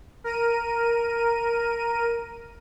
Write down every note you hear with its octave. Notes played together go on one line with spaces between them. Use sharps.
A#4 D#7